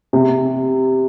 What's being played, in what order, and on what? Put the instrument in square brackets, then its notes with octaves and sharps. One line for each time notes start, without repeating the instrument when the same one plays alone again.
[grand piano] C3